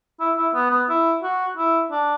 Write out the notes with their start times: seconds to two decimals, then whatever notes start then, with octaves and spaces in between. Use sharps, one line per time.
0.20 E4
0.37 E4
0.54 B3
0.71 B3
0.89 E4
1.23 F#4
1.57 E4
1.91 D4